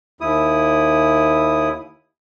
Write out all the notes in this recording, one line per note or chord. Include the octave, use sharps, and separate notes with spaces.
D#2 E4 D#6